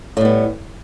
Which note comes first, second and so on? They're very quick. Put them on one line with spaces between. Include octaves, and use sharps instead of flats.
A2 G3 B3